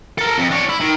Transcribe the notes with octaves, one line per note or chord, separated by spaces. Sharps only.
A4 A#4
F2
D4 C#5
E4
D#3